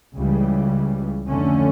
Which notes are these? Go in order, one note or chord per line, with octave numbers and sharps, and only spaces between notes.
C#2 C#3 E3 G3
F2 D3 A3 C#4